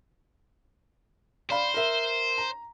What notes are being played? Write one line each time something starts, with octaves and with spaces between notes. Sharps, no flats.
C5 D5 F5 B5
A#4 E5
A#5